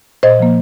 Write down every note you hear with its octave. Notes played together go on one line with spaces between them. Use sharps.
A#2 C5 D#5
F3 A#3